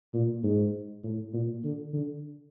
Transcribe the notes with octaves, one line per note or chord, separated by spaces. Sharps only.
A#2
G#2
A2
A#2
D3
D3